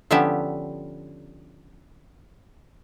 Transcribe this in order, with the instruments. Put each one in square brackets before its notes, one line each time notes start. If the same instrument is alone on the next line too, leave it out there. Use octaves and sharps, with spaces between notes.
[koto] D3 F3 B3 C#4 G4 E5